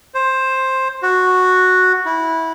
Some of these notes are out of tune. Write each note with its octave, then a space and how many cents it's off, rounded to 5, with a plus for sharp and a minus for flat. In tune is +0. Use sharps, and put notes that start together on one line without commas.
C5 +10
F#4 -5
E4 -20